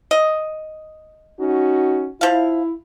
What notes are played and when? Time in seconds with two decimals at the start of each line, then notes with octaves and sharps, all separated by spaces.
0.11 D#5
1.40 C#4 D#4 F#4
2.21 F3 E4 F5